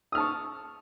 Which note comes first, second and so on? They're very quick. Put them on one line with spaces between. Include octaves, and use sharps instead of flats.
D#6 F6 A5 C#6